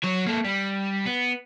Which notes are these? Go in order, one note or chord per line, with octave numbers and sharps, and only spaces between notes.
F#3 C#5
A#3 A4
G3
B3